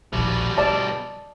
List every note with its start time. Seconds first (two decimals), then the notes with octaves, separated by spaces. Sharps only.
0.13 A#1 D#2 B2 G3
0.58 D3 D5 D#5 A5